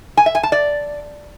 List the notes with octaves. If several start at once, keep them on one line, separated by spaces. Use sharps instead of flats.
G#5
E5
G#5
A5
D5